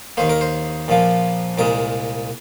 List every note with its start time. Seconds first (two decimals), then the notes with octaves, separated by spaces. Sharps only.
0.17 D#2 D#3 A#3 C5
0.29 A#4
0.41 C5
0.88 A#1 A#2 F3 A#3
1.58 C2 A#2 G#3 A#4